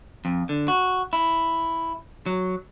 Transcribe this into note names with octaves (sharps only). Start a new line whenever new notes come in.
F2
D3
F#4
E4
F#3